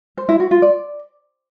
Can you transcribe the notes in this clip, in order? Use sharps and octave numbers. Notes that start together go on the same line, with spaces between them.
C5
E4
F#4
F4
D5